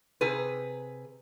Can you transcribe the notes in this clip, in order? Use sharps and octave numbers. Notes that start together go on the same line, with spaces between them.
C3 G#4 B4